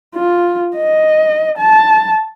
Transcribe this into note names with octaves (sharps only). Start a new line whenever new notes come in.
F4
D#5
A5